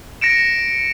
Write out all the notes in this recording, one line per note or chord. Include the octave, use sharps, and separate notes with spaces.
A#6 C#7 D7 E7